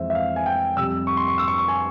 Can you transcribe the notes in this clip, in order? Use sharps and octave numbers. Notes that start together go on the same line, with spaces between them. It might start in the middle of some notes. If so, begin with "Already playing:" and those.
Already playing: F2 E3 G#3 C5 E5
E5
F5
G#5
G5
F2 C3 G3 E6
C#6
C6
C#6
E6
C#6
C#6
G#5